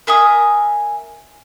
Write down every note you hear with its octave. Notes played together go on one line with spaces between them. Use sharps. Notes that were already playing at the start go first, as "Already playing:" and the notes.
A#4 E5 G#5 D#6